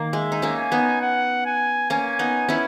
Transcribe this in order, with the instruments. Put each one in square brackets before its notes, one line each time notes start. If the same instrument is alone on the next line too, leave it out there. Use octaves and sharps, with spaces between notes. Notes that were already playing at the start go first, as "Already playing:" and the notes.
Already playing: [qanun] D#3 A#3
[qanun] G#3 [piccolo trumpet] E5
[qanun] D#4
A#3 C#4
[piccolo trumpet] G#5
[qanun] B3 D#4
[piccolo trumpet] F#5
G#5
[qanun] A#3 C#4 [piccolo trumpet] G#5
[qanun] B3 D#4
C#4 E4